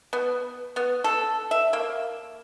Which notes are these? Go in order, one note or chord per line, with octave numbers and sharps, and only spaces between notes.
B3
B3
A4
E5
A#3